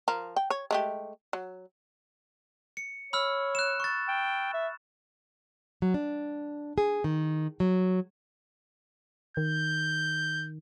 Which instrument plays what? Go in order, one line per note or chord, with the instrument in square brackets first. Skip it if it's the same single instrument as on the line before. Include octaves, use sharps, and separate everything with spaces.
[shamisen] F3 A#4
G5
C#5
G#3 A3 G4
F#3
[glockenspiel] C#7
[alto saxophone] C#5 [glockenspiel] B5 E6 F6
[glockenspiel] F#6 E7
C#6 A6
[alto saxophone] G5
E5
[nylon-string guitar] F#3
D4
G#4
D#3
F#3
[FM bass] D#3 [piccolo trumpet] G6